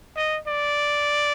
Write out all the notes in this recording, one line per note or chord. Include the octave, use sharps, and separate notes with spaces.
D#5
D5